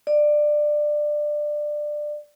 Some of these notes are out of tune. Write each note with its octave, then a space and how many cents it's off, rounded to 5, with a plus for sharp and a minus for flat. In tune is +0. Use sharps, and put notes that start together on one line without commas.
D5 +20